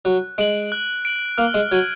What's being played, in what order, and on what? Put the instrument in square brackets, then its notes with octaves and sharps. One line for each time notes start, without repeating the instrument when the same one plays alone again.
[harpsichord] F#3 [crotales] F#6
[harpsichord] G#3 [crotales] D7 F#7
[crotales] F#6
D7 F#7
[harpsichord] A#3 [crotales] F6
[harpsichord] G#3
[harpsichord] F#3 [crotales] G#6 D#7 F#7